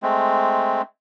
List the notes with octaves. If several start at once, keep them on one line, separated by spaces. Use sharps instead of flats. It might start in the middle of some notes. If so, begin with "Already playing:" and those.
G#3 A3 C4